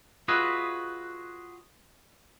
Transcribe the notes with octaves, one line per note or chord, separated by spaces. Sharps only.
F4 F#4 G#4 B4 D#5 E5